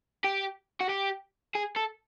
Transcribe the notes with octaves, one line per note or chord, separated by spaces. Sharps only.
G4
F#4
G4
G#4
A4